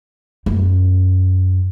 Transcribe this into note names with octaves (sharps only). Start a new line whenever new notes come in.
F#2